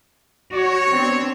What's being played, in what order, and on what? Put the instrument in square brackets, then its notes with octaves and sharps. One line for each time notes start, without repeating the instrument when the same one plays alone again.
[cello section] F#4 [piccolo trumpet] C#5
[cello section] B3 C4 D4